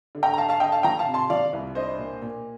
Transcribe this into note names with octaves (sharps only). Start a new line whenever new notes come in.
D3
G5 A#5
A#5
D#4 F5 A5
F5 A5
D3 D#5 G5
F5 A5
F3 G5 A#5
F5 A5
C3
A5 C6
F3 D5 F5
C2
D4 C5 D#5
A#2
A#2